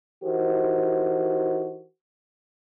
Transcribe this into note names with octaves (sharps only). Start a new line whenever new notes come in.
E3 D#4 F#4 G4 A#4 C5